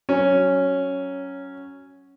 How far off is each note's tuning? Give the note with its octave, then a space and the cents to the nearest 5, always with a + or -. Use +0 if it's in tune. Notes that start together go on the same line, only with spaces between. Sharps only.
F#3 +10 C#4 +0